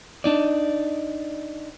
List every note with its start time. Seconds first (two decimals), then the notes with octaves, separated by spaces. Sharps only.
0.24 D4 D#4 D5